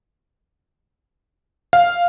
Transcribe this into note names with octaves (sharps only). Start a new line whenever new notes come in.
F5